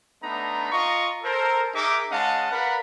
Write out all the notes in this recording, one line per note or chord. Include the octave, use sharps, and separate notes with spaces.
A3 B3 D4 D#4 A#5 B5
F4 D#5 A#5 C#6
A4 A#4 C5
D#4 G#4 A#4 E5 D6
G#3 C#4 D#5 F5 F#5 A5
A#4 B4 D5 F5 F#5 B5